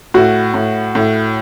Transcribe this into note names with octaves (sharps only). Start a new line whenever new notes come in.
A2 F#4
A2
A2